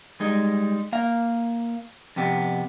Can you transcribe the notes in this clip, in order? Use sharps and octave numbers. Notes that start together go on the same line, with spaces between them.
G3 G#3 D#4
A#3 F5
F2 C3 B3 G4